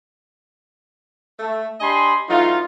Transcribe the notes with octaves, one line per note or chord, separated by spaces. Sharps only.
A3
D4 G4 D#5 G#5 B5 C6
E3 F#3 A3 D#4 F4